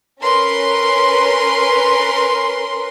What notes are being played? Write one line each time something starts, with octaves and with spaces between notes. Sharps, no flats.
C#4 A#4 B4 C6